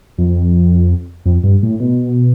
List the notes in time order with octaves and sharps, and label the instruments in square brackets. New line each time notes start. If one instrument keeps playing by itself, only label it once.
[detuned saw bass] F2
F2
G2
A2
B2